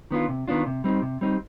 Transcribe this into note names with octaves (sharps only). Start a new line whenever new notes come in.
D#3 B3 D4 F4
C3
D#3 B3 D4 F4
C3
G3 C4 D#4
C3
G3 C4 D#4